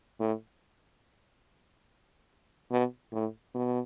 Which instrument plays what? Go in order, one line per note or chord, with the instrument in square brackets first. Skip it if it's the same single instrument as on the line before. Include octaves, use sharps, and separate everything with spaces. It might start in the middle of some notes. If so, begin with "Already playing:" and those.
[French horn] A2
B2
A2
B2